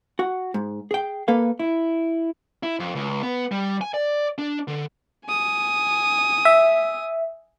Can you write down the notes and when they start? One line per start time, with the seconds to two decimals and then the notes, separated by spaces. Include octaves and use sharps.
0.19 F#4 F#5
0.54 G#2
0.91 G#4 G5
1.28 A#3 A4 B4 F5
1.59 E4
2.63 E4
2.80 F2
2.95 C#2
3.23 B3
3.52 G3
3.81 G#5
3.94 D5
4.38 D4
4.68 D3
5.26 G#5 D#6
6.45 E5